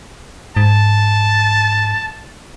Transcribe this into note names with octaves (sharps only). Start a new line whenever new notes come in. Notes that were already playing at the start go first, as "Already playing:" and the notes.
G#2 A5